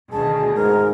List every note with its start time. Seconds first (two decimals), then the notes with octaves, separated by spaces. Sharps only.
0.12 D2 B2 D#3 G#4 A5
0.55 G#2 A#4